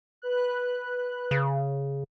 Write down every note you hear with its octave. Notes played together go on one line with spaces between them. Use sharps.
B4 F#6
C#3